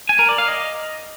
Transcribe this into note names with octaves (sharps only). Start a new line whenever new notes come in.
G#5
A#4
D5
F5
D#5